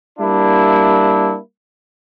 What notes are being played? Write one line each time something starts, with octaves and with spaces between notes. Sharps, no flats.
G3 A#3 D4 E4